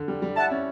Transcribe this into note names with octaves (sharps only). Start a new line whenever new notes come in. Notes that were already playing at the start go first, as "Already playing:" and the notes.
Already playing: D3
G3
G3
E4 F#5 A5
C#4